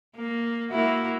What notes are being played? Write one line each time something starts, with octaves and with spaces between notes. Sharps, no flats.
A#3
A#3 E4 F#4